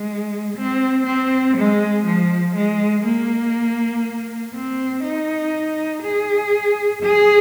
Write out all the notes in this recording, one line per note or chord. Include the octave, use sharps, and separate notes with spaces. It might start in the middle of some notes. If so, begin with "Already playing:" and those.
Already playing: G#3
C4
C4
G#3
F3
G#3
A#3
C4
D#4
G#4
G#4